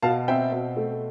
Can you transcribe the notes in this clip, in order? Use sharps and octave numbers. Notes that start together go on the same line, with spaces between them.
B2 F5 A5
C4 E5 G5
B2
A3